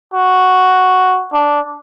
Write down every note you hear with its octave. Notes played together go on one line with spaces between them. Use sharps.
F#4
D4